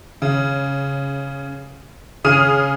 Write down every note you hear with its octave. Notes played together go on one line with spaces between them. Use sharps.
C#3
C#3 G#4 D#6 F6 D#7